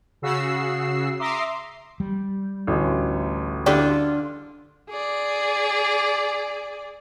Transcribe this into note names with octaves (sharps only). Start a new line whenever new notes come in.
C#3 F#4 E6 C7
E5 A#5 C6 D6 D#6 C7
G3
A1 D2
D3 E4 F4 G4 D5
G#4 D5